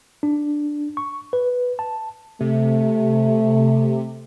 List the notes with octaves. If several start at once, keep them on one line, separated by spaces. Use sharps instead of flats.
D4
C#6
B4
A5
C3 A3